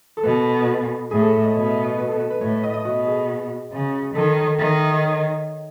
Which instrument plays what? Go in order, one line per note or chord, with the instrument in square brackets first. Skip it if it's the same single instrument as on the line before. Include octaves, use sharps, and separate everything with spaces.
[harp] A4
[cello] B2 [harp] B4
[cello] A2 [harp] G#4
[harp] A4
E5
D#5
[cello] B2 [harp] C#5
[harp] E5
D#5
D#5
B4
A4
B4
B4
[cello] A2 [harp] C#5
[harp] E5
D#5
D#5
[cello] B2 [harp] F#4
[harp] G#4
[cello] C#3
[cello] D#3 [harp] A4
[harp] C#5
C#5
C#5
[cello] D#3 [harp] E5
[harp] D#5
D#5
C#5